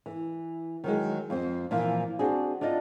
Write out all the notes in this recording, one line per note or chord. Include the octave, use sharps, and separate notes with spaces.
E3
D#3 F#3 G#3
F2 C4
A#2 E3 F3 F5
C4 D4 F#4 G#4
D4 D#4 F4 D5 D#5